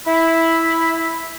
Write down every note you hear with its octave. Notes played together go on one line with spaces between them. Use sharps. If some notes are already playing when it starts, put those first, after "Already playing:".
E4 B5